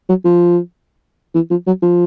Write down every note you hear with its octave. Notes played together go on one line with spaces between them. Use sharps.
F#3
F3
E3
F3
F#3
F3